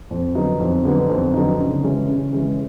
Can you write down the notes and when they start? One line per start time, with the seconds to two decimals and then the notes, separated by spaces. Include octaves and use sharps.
0.11 F2
0.35 D3 F#3 B3 D#4
0.60 F2
0.85 D3 F#3 B3 D#4
1.09 F2
1.34 D3 F#3 B3 D#4
1.59 C#3
1.84 E3 G#3 C#4
2.08 C#3
2.33 E3 G#3 C#4